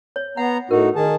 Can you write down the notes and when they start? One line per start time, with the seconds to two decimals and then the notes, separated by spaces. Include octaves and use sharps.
0.16 C#5
0.37 B3 F#5 A#5
0.71 A2 D#4 F#4 A#4
0.96 D#3 G#4 A5